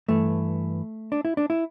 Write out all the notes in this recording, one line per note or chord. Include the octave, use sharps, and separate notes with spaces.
G2 E3 A3
D4
E4
D4
E4